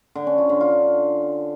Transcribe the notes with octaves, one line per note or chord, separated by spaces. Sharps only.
D3
C#4
F4
D3
F4